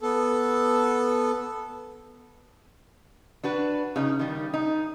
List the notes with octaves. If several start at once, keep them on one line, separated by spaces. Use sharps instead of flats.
B3 A4
D4 F#4 B4
C#3 D#4
D#3 G3
D#4